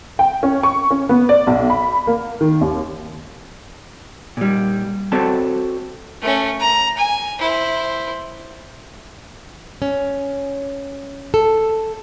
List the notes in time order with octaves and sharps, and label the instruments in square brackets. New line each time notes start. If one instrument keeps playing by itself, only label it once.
[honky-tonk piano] G5
C#4
C#6
C#4
B3
D5
B1
B5
A#3
D#3
D#2
[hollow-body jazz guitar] A#2 G3
C4 F#4 A4 D5 A5
[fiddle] A3 C#4
A#5
G#5
E4 C5
[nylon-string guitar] C#4
A4